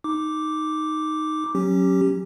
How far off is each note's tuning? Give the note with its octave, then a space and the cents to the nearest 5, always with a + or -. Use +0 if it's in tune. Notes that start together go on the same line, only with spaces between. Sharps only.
D#4 +0 D6 +0
F#3 +0 C#4 -15 G4 +0